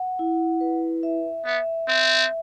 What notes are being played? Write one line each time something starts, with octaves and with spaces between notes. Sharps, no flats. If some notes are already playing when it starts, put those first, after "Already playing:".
Already playing: F#5
E4
B4
E5
B3 E5
C4 E5